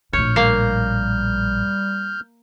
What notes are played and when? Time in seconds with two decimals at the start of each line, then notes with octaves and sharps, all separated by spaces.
0.13 A#1 A2 C#5 F6 G6
0.36 G3 A#3 F5